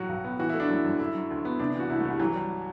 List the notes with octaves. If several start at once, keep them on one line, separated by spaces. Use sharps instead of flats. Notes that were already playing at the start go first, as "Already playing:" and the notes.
Already playing: A2 F#3 F#4
B1
B3
E3 F#4
A3 E4
D4
F#2 E4
F#2
D3 E4
F#3
D2
B3
C3 D4
D4
E3 F#4
C2 E4
A3
C2
G3
E3 F#3
G3